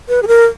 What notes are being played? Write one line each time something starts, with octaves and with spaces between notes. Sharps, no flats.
B4
G#4
A#4